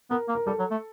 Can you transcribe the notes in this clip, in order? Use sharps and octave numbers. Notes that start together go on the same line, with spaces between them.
B3 A#4
A#3
A#4
G3 A4
F#3
A3